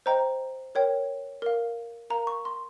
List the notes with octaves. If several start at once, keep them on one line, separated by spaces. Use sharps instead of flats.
C5 D#5 G5 A#5
A#4 C#5 G5
A#4 F5
A#4 F5 A#5
C#6
C6